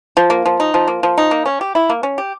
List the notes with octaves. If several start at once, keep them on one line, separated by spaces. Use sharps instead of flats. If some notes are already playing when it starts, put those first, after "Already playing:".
F3
A#3
F3
D#4
F3
A#3
F3
D#4
A#3
C#4
G4
E4
A#3
C#4
G4